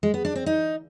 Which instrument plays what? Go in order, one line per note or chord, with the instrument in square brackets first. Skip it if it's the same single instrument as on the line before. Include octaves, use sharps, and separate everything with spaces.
[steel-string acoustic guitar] G#3
B3
D4
C4
D#4